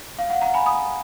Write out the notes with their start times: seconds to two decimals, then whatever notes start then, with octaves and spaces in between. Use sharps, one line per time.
0.18 F5
0.30 F#5
0.42 F#5 A#5
0.54 G#5 B5
0.66 B5 D#6